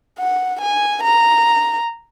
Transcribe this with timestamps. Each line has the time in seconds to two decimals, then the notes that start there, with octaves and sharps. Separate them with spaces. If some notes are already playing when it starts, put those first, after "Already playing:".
0.19 F#5
0.61 G#5
1.03 A#5